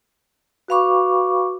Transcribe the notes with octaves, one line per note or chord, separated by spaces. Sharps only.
F#4 B4 F5 B5 C#6 D6